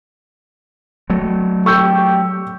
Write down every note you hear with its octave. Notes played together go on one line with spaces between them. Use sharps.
F#3 A3
G4 C#6 E6 G6